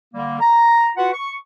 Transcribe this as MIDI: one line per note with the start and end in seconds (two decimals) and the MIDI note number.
0.14 0.38 50
0.14 0.38 55
0.14 0.38 58
0.41 0.89 82
0.97 1.09 65
0.97 1.09 66
0.97 1.09 71
0.97 1.09 78
1.13 1.35 85